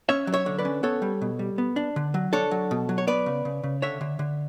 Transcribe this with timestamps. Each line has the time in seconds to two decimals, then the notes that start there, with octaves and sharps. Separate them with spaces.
0.09 C#4 C#5 E5
0.27 F#3
0.34 C#5 E5
0.46 D3
0.59 B4 D5
0.65 C#4
0.83 B3 A4 C#5
1.02 G3
1.21 B2
1.39 G3
1.58 B3
1.76 D4
1.96 D3
2.14 F#3
2.33 D4 A4 C#5
2.51 F#3
2.71 B2
2.89 F#3
2.98 C#5
3.07 B3 B4 D5
3.26 C#3
3.45 C#3
3.64 C#3
3.82 D3 C#5 E5
4.01 D3
4.19 D3